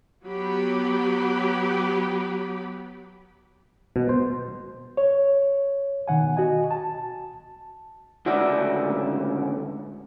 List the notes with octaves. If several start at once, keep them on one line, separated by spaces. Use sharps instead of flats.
F#3 B3 G4 B5
B2
C5
C#5
B2 D#3 F#5 G#5
F#4 D#5 G#5
A5
C#2 A2 D3 F#4 D5 E5